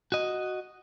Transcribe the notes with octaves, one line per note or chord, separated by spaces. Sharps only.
F#4 D#5